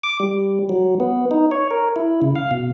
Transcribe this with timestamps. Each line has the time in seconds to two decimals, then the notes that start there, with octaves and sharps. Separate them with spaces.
0.03 D6
0.20 G3
0.69 F#3
1.00 B3
1.31 D#4
1.51 C#5
1.71 A#4
1.96 E4
2.22 C#3
2.36 F5
2.51 B2